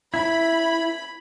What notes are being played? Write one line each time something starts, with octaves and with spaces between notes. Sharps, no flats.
E4 B5